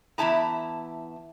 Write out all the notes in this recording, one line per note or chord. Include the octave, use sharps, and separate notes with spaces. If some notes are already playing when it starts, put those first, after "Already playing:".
E2 C3 E4 A5 A#5